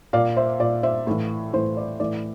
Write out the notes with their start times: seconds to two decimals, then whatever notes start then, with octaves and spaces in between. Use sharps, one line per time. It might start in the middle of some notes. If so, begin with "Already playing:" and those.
0.13 A#2 D5 F5
0.37 C5 E5
0.59 A#2 D5
0.83 C5 E5
1.07 A2 E3
1.53 A2 E3 C5
1.77 D5
2.00 A2 E3 D5